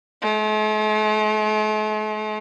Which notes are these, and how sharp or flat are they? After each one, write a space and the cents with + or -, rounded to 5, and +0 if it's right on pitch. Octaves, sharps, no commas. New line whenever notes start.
A3 -45